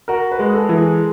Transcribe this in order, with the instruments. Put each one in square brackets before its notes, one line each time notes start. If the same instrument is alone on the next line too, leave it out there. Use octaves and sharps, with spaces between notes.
[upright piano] F#4 [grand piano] A#4
[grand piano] B4
[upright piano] G#3
[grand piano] G#4
A4
[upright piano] E3
[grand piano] G#4